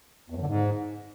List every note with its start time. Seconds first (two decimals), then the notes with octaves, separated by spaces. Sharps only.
0.30 E2
0.36 F#2
0.42 D3
0.48 G#2